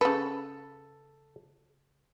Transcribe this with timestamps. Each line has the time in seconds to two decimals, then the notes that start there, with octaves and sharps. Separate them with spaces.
0.01 C#3 A4 B4